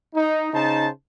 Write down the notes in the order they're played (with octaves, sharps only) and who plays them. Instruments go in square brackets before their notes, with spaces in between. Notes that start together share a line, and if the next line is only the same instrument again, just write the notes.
[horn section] D#4
C#3 D#4 C5 A5